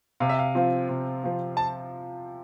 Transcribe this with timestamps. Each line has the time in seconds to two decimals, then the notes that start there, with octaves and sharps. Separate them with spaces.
0.20 C3 F5
0.29 E5
0.39 F5
0.55 F3 C4 F4
0.89 C3
1.23 F3 C4 F4
1.57 A5